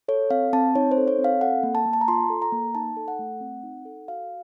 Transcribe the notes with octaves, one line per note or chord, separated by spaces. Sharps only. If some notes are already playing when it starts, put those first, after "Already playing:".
A4 C#5
C4 F5
C4 A5
D#4 C#5
C5
A4
C#5
C4
F5
A4 F#5
A#3
A5
A#3
A5
A#5
F4 C6
A4
A#5
A#3
D#4 A5
A4
F#5
A3
C4
D#4
A4
F#4 F5